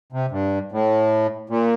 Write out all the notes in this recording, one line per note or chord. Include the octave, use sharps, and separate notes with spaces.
C3
G2
A2
A#2